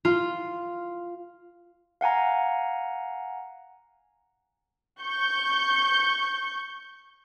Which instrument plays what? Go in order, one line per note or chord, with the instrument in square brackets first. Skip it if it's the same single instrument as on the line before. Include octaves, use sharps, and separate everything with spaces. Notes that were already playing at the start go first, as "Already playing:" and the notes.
[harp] F4
[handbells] F5 F#5 G#5 A#5
[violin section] C#6 G6